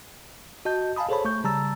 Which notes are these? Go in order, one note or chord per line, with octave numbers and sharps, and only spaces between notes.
F#4 D#5 A5 G6
F5 G#5 A5 B5 D#6
G#4 A4 C5 C#5 A5 B5
A3 C#6 G6
C#3 G3 A5 A#5 E6 A6